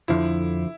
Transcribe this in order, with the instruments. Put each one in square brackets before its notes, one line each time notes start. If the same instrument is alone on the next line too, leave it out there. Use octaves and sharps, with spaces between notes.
[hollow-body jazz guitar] F2 D3 F3 [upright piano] E4